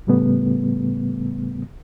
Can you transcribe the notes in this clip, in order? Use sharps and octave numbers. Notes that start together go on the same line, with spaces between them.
A2 C#3 G3 A3 B3